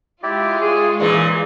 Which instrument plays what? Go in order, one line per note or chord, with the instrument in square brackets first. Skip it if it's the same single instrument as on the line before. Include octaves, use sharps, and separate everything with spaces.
[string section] G#3 F4 [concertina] E4 G4 D5
[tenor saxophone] G#4 [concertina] C#5
[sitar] A#2 E3 [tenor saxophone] G#4